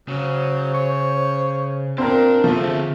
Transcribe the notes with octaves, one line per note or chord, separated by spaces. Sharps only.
C#3 F#3 C5
C#5
A#2 C4 D4 A#4
F3 A3 C5 E5
D3 C4 G#4